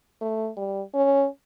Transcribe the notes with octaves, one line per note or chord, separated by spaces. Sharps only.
A3
G3
C#4